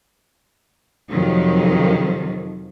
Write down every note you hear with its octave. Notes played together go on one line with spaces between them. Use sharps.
F2 C3 D#3 F3 F#3